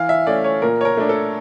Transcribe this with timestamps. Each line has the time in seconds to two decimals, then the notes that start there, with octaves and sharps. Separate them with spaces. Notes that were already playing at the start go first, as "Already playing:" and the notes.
Already playing: E3 F5
0.09 E5
0.27 A3 C#4 D5
0.44 C#5
0.62 A#2 A#4
0.81 C#5
0.85 A#4
0.97 A3 D4
1.09 A4